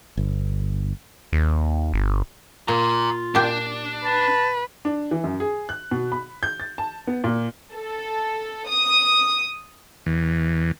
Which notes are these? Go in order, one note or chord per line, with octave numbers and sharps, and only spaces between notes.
G1
D#2
G1
A#2 F4 A#5 C6
A#2 D4 G4
B4 A5
D4
E3
F#2
G#4
F#6
B2
B5
G6
A6
A5
B3
A#2
A4
D#6
E2